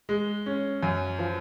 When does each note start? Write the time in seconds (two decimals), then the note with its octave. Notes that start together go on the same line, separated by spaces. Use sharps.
0.09 G#3
0.46 C#4
0.83 F#2
1.19 F3